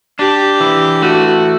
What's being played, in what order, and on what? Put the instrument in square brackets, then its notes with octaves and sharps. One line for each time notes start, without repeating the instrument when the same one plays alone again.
[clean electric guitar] D4 [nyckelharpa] G4
[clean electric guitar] E3
[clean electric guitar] A3 [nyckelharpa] F#4